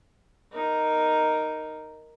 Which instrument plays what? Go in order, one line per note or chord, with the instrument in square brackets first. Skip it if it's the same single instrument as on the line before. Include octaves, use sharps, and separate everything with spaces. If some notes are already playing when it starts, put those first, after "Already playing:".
[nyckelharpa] D#4 A#4